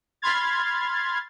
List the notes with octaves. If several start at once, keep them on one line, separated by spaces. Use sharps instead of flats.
B5 C6 F6 G#6 A6